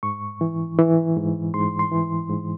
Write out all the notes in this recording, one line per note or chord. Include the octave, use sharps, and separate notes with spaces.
G#2 C#6
E3
E3
G#2
G#2 C6
C6
E3
G#2